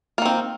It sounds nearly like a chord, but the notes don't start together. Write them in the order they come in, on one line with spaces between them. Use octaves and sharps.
A#3 D#3 C4